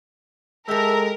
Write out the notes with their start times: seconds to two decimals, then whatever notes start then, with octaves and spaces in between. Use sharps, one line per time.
0.68 G#3 G4 A4 A#4 E5